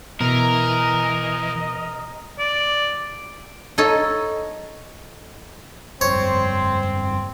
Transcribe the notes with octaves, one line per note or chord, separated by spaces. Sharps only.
B2 E3 A#4 D#5
D5
D#4 A4 C#5 D#5
F1 G2 C4 C5 C#5